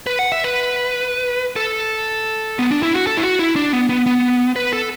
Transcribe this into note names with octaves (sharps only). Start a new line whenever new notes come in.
B4
F#5
E5
B4
A4
B3
D4
E4
F#4
A4
E4
F#4
E4
D4
B3
B3
B3
B4
A4